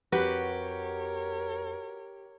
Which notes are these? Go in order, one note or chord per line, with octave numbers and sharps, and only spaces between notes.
F2 F#4 G4 A#4 B4 C#5